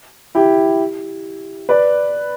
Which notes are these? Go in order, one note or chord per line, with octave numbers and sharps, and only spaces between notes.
E4 G4
B4 D5